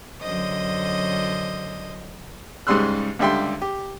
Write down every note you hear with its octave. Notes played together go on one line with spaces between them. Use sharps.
F#2 D3 C5 D#5 D#6
G#2 C#3 G3 C6 E6 F#6
C#2 D3 G3 E5 G5 C6
G4